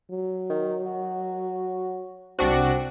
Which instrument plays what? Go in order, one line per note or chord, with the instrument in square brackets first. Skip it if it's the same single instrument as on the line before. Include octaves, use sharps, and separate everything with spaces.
[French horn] F#3
[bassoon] D#3
F#4
[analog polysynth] C2 D4 F#4 [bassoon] C4